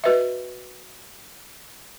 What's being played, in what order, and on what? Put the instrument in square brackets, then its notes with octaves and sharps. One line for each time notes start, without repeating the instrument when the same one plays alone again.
[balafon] F#4 B4 D#5 E5